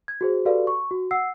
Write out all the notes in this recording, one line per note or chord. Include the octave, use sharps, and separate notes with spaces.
G#6
F#4 G#4 C5
F#4 G4 A4 B4 D5 F5
C#6
F#4
F#5 E6 C7